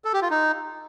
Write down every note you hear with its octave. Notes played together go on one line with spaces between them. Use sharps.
A4
G4
F4
D#4